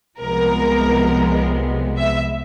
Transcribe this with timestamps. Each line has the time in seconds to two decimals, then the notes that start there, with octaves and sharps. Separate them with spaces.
0.20 C2 C3 F3 G#3 B3 A#4
1.97 E5